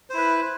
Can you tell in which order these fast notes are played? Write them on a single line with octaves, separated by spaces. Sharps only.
C5 E4 B4